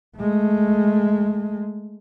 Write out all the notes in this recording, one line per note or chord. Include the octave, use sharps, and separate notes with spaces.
G#3 A3